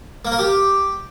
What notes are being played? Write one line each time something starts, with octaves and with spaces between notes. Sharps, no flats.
A#3
A#4
G4